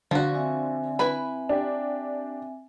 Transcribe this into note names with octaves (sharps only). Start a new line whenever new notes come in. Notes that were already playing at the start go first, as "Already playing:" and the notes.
D3 F3 F#4
C4 E5 G#5
E4 B4 B5
D4 G4